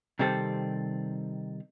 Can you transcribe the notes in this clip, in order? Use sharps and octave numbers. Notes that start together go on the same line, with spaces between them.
C3 D#3 G3 C4 G4 A4